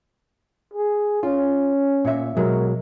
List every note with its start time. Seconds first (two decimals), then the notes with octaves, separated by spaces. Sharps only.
0.74 G#4
1.23 C#4 F4
2.05 A#2 C#5 E5
2.37 B2 F#3 G#3 A#4